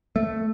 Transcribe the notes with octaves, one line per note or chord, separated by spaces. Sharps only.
A3